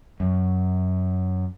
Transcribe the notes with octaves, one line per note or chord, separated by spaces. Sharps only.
F#2